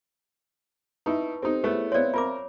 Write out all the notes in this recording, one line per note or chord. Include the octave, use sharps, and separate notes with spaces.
D#4 E4 B4 A5 C#6
C4 D#4 G4 A4 C5
A3 B3 E4 G#4 C#5
B3 C4 C#5 D5 E5 F5 C6
C4 F4 A#4 C#5 D6